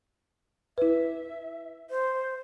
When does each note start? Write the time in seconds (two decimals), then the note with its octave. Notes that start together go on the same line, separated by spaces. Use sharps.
0.78 E4 B4 E5
1.90 C5